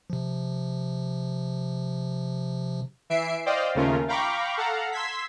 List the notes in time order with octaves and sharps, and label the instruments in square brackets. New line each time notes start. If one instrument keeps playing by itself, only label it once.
[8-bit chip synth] C3 F3
[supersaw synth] E3 E5 C7 D7
C5 D5 D#5 F5 G5
D#2 C#3 A3 C#4 F4 A#4
F5 G5 A#5 B5 C#6 D6
A4 F5 F#5 A#5
C6 E6 G#6 B6